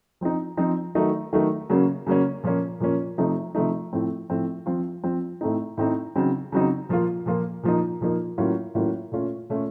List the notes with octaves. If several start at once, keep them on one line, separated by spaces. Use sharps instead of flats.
F3 C4 D#4
F3 C4 D#4
D#3 F#3 A3 D#4
D#3 F#3 A3 D#4
C#3 F#3 A#3 C#4
C#3 F#3 A#3 C#4
A#2 F3 A#3 C#4
A#2 F3 A#3 C#4
C3 F3 A3 D#4
C3 F3 A3 D#4
A2 F3 A3 C4
A2 F3 A3 C4
F3 C4 F4
F3 C4 F4
A2 A3 C4 D#4
A2 A3 C4 D#4
C#3 F#3 C4 D#4
C#3 F#3 C4 D#4
A#2 F3 A#3 F4
A#2 F3 A#3 F4
A#2 F3 A#3 D#4
A#2 F3 A#3 D#4
A2 F#3 A#3 C#4 F4
A2 F#3 A#3 C#4 F4
A#2 A3 C#4 F4
A#2 A3 C#4 F4